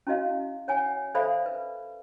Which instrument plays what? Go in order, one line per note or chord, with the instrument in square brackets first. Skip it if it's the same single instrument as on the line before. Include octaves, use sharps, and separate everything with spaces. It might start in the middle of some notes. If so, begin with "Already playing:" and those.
[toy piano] C#4 E4 F#4 D#5 F5
C#5 F#5 G#5
A4 C5 D5 E5 F5 B5
B4